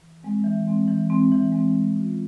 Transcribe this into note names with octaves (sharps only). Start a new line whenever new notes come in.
E3
G#3 C4
E3
G#3 C4
E3
G#3 C4
E3
G#3 C4
G#3
C#4 F4